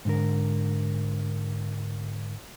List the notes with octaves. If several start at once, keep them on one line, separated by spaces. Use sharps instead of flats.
G#2 D3 A#4